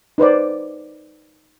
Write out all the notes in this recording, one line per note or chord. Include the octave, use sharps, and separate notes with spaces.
D#4 B4 C5 D5